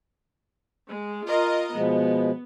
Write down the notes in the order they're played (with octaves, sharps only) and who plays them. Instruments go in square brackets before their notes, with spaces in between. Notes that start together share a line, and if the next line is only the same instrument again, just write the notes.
[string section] G#3
F4 A#4 D#5
[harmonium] B2 F3 G#3 [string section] B3